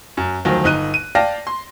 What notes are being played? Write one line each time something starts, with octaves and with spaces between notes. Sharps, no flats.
F#2
D2 D#3 F3 F#3
G1 D#4 F#6 D#7
D#7
D5 F5 G5 A5 A#6
C6